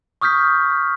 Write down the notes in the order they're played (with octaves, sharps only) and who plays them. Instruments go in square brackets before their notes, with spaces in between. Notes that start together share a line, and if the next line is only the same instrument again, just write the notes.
[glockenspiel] C#6 D#6 F6 G6 B6